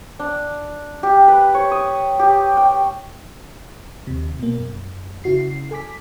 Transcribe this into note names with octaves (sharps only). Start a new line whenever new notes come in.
D4
G4
B4
C#5
D#6
G4
G5
D#2 C3
B2 A#3
F#2
C#3 E4 F#4 C7
A4 G#5 D6 B6